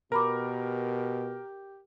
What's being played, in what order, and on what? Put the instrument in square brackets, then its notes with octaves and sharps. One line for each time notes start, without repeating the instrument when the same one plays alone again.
[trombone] B2 [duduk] G4 [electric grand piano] A#4 [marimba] A#5 B5 D6